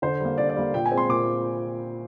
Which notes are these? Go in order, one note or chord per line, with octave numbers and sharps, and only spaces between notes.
D3 C5
G3 A#3
D3 D5
D5
G3 A#3
A#2 G5
G#5
G#3 C4
C6
A#2 D6